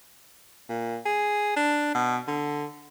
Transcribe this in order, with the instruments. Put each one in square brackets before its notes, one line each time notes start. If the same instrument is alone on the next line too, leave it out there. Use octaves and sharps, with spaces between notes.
[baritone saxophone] A#2
G#4
D4
B2
D3